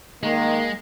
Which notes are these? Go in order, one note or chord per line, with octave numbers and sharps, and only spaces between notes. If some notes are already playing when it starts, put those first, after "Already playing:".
D#3 G#3 A#3